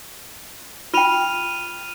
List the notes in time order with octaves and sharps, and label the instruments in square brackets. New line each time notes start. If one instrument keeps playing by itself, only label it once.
[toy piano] F4 G5 [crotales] F6 D#7 F7